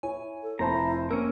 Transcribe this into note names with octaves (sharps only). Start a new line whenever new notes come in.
E4 C#5 G#5
A4
F1 E4 C5 A5 A#5
A#3 C4 C#4 A#4 E6